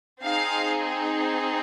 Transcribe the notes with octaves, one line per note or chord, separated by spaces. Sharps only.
C4 D#4 G#4 F5